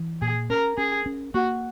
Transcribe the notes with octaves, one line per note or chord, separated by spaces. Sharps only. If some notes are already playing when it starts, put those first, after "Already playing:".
Already playing: E3
A#2 G#4
C#4 A#4
C#4 G#4
C#4
A#3 F#4